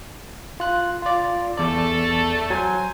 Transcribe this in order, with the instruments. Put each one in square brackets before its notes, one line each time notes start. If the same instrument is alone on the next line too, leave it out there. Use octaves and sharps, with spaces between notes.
[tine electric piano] F4 F#6
F4 D5
[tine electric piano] E2 D5 [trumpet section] A3 A4 A5
[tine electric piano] F#3 [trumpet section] C5 G#5